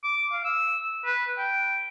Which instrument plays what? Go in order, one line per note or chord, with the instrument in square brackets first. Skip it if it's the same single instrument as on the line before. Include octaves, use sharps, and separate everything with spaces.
[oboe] D6
F5
E6
B4
G5